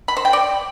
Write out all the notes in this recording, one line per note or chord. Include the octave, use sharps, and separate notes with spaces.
B5
C5
G5
D5